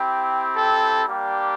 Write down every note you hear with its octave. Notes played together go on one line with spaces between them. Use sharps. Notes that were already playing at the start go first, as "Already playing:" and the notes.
Already playing: C4 E4 G4
A4
G3 A#3 D4 G4